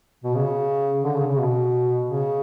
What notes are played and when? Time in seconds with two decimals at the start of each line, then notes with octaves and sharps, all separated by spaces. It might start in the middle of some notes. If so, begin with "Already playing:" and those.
0.24 B2
0.35 C#3
1.04 D3
1.16 C#3
1.27 C#3
1.39 B2
2.08 C#3